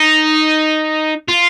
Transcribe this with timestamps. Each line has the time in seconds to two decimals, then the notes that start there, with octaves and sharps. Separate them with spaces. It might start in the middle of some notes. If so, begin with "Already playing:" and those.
Already playing: D#4
1.28 F4